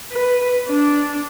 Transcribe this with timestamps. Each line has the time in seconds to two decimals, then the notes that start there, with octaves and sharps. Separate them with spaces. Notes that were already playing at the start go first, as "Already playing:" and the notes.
0.12 B4
0.68 D4